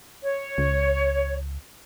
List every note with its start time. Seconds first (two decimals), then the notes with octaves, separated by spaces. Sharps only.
0.23 C#5
0.58 C#2